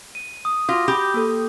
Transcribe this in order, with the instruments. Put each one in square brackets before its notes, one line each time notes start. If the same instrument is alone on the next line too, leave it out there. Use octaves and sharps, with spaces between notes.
[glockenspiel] D#7
D#6
[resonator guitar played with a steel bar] F4 [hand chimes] F#4 A#6 [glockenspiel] D6
[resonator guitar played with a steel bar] G4 [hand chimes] B5
[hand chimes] A#3 A4